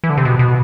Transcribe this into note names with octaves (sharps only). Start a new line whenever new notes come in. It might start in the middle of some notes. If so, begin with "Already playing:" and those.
E3
D3
C3
B2
B2